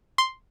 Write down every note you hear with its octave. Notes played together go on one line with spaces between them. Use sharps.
C6